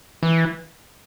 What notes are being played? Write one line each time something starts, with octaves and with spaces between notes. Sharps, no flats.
E3